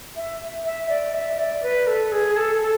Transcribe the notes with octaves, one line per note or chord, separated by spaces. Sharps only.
E5
E5
D5
E5
D5
B4
A4
G#4
A4
A4